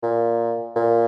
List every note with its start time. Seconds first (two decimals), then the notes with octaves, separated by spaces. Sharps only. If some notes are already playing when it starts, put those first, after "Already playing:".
0.03 A#2
0.76 A#2